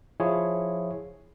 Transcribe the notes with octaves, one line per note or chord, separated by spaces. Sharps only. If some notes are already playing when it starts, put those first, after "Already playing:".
F3 E4 F4 G#4 C#5